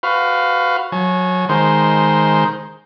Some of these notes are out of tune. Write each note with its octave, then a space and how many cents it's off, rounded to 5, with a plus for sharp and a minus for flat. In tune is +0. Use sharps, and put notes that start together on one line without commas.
F#4 +0 B4 +30 F5 +0
F#3 -20 G#5 +35
D#3 +0 G#3 +5 C5 +0